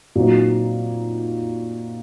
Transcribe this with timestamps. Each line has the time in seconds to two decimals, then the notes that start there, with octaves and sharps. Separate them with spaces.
0.15 A#2 F#3 C4 D#4 F#4